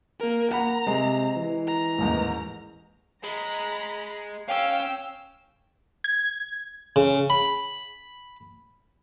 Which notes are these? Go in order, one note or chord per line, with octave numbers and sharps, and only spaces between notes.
A#3 A#4
A#3 F#5 A#5 B5
C3 G#3
E3
A#5
A1 D#2 G#2
G#3 A#5 B5
C#4 F5 G5 E6
G#6
C#3
B5